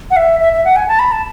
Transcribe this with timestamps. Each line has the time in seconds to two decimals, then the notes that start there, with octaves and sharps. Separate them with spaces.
0.11 F#5
0.17 E5
0.40 E5
0.53 E5
0.65 F#5
0.76 G#5
0.88 A5
0.99 B5
1.12 A5